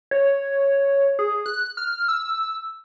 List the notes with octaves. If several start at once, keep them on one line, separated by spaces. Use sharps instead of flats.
C#5
G#4
F#6
F6
E6